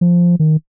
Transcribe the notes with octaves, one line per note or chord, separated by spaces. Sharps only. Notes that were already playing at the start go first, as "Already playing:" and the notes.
F3
D#3